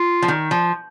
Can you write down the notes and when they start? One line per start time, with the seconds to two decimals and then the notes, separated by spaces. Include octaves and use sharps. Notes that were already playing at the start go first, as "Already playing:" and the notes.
Already playing: F4
0.22 F3
0.28 D#3
0.51 F3